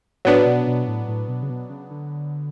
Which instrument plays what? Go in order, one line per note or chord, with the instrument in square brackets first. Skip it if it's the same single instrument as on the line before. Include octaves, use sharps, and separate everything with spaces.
[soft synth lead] A2 [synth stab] F#3 B3 D4
[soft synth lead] B2
B2
A2
A2
B2
C#3
B2
C#3
D3